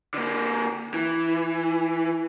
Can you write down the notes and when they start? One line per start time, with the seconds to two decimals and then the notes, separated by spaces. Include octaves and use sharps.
0.14 D3 A#3
0.94 E3